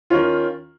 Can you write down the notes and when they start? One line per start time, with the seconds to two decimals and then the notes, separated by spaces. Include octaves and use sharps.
0.10 D#3 C#4 F4